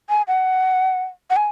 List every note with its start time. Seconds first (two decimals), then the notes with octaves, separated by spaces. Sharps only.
0.09 G#5
0.28 F#5
1.30 F#5
1.36 G#5